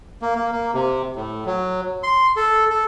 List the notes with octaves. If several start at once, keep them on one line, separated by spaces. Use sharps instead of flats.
A#3
A#3
A#3
C3
A2
F#3
C6
A4
A4